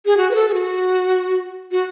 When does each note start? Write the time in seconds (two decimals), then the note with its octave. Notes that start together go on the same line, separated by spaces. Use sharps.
0.06 G#4
0.17 F#4
0.31 B4
0.35 A4
0.49 G#4
0.54 F#4
1.72 F#4